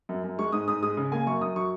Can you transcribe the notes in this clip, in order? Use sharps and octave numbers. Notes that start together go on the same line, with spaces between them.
F#2
F#2
G#3 C#6
G#2 D#6
G#2 D#6
G#3 D#6
C#3
A#3 G#5
F#2 C#6
F#2 D#6
F#3 C#6